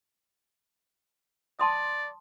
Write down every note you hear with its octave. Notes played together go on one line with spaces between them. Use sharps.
D5 A5 C6 D#6